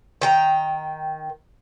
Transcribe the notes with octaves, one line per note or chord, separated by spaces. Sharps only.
D#3 G5 A#5